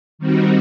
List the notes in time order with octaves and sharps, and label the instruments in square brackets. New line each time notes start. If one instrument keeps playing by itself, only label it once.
[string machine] D#3 G3 C4 D#4 F#4